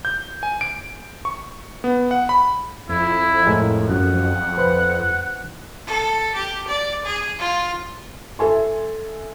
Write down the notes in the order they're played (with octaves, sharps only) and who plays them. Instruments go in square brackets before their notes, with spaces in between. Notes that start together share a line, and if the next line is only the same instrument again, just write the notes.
[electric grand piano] G6
G#5
D7
C#6
B3
F#5
B5
[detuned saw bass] F2 [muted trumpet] E4
[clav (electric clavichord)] A2 G#3 A#4
[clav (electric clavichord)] F#2 [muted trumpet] F#5
[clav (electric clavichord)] B4 C5
[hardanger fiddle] A4
G4
D5
G#4
F4
[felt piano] A4 E5 G#5 C6